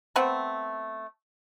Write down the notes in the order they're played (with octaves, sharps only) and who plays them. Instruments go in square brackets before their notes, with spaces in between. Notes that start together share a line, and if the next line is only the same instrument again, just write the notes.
[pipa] A3 B3 C4 F#5